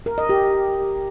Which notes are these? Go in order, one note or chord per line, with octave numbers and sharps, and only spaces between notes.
A#4
D#5
G4